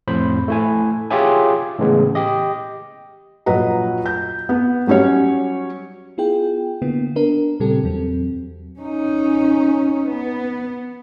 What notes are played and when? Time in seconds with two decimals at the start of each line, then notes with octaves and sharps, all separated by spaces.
0.08 F2 A2 C5 B5
0.48 A3 E4 G#5
1.11 F4 G4 G#4 C#5 E5 G#5
1.79 A2 C#3 E3 G#3 B3
2.15 G4 D#5
3.46 A#1 F#3 B4 D#5 A#5
4.06 G6
4.49 B3
4.87 F#3 G3 C#4 G4 C#5
6.18 B3 E4 F4 G#4 G5
6.82 D3 A#3 B3 E4
7.16 B3 D4 A#4
7.60 A#2 C#3 G3 C4 G4 A4
7.84 E2 F#3 C4
8.80 C#4 D#4
10.08 B3